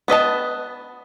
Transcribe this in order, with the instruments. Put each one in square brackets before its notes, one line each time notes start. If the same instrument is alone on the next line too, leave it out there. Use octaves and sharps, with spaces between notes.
[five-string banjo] B3 B4 D#5 A5